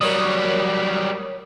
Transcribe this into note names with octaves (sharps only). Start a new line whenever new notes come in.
F#3 G3 A#4 C#5 D#6